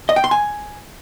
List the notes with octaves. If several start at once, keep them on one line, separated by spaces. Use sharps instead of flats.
D#5
G5
C6
G#5